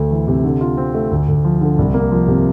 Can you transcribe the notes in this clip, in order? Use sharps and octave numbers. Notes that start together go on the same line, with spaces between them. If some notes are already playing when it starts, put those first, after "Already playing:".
Already playing: D2 A3
E3
C3
D3
F4
C4
A3
D2
D2
F3
D3
C2
A#3
F3
C3